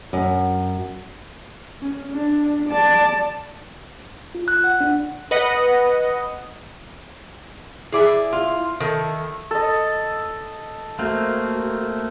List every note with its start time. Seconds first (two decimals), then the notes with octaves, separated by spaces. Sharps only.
0.13 F#2
1.81 C#4
2.11 D4
2.68 D5 A5
4.35 F4
4.48 F#6
4.64 F#5
4.80 D4
5.31 B4 D#5 F#5
7.92 E4 G#4 D5 E5
8.33 F4
8.80 D#3 E4 A4
9.51 A4 D#5
10.99 A3 A#3 C4 F#4